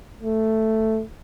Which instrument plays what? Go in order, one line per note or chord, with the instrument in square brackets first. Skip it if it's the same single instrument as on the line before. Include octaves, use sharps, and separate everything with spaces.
[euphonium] A3